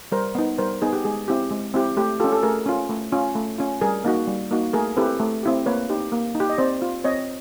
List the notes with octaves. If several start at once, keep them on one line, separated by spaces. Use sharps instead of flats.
G3 A#4 C5
B3 D#4
G3 A#4 C5
B3 D#4 G#4
G4
G#3 G#4
C4 E4 G4
G#3
C4 E4 G4
A3 G4
C#4 F4 G4 A4
A4
A3 G#4 A#4
C#4 F4
A3
C#4 F4
A3
C#4 F4
G3 G#4 A#4
A#3 D#4 F#4
G3
A#3 D#4 F#4
A3 G#4 A#4
C4 E4 G4 A4 B4
A3
C4 E4 G4
A#3 B4 C#5
D#4 G4
A#3
D#4
G4
D#5
C4 C5 D5
F4
C4 C#5 D#5